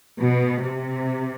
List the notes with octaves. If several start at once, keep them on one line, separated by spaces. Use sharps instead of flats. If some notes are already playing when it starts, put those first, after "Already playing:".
B2
C3